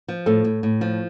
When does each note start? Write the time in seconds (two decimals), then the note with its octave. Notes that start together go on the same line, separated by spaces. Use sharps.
0.08 F3
0.26 A2 A4
0.44 A2
0.63 A2
0.81 F3